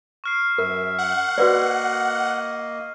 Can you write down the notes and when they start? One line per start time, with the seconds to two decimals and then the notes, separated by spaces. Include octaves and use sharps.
0.24 C#6 F6 C7
0.58 F#2 A#4 E5
0.98 F#5
1.38 A#3 F#4 B4 D5 D#5